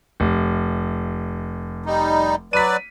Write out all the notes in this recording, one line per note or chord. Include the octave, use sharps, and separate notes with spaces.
F1
G3 D#4
F#3 B4 D5 B6 D#7